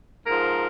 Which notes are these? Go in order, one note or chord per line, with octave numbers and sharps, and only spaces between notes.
G#2 F3 A#4